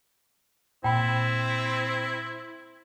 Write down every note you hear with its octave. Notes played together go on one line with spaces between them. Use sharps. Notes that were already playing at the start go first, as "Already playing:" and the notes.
A#2 C4 E4 G5 B5 E6